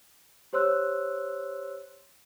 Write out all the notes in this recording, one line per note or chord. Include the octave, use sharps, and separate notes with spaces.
G4 C5 C#5 C6 E6 F#6